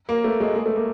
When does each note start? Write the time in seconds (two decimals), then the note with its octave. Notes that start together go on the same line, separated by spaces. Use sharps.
0.09 A#3
0.24 A3
0.40 G#3
0.55 G#3
0.66 A3
0.76 A#3